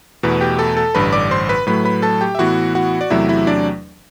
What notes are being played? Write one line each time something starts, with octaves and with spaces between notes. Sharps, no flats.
E2 B2 A3 E4 B4
G4 G5
A4 A5
A4 A5
A1 G2 D3 B4 B5
D5 D6
C5 C6
B4 B5
A2 F#3 A3 B4 B5
B4 B5
A4 A5
G4 G5
E5
A2 E3 B3 F#4 F#5
F#4 F#5
D5
E2 C3 F#3 A3 E4 E5
E4 E5
D4 D5